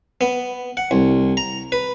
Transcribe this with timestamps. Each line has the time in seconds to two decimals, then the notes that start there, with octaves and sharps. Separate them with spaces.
0.21 B3
0.77 F#5
0.91 C2
1.37 A#5
1.72 B4